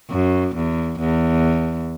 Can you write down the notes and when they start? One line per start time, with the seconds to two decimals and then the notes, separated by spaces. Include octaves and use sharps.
0.10 F#2
0.55 E2
1.00 E2